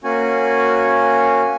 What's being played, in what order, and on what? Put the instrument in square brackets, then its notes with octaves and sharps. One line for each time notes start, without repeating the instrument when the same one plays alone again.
[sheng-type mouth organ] A#3 C#4 F#4 G#5